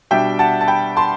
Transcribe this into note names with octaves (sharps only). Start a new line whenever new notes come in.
B2 G3 D4 E5 G5
F#5 A5
A5
G5 B5
A5 C6